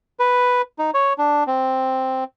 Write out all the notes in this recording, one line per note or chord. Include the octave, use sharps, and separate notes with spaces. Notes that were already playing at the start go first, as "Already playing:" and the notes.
B4
D#4
C#5
D4
C4